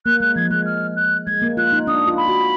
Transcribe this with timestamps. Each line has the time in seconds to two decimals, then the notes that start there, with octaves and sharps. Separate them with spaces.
0.06 A#3 F#6
0.20 G#3 F#6
0.36 F3 G#6
0.51 G#3 F#6
0.66 F6
0.96 F#6
1.27 G#3 G#6
1.42 A#3
1.57 F4 F#6
1.73 D#4
1.87 D4 D#6
2.07 F4
2.17 B5
2.28 F#4